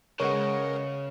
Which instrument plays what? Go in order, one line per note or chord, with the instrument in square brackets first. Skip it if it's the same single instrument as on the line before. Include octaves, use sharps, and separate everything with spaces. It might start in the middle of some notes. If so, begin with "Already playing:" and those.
[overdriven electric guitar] C#3 [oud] G#3 B3 [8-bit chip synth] A#4 D#5 F#5 [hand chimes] C#5 C#6